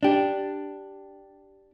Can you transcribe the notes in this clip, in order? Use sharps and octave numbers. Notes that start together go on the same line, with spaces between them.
D4 G4